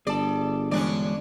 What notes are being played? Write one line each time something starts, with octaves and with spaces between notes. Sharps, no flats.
G1 G#4 D5 A5
E3 G#3 C#4 D4 D5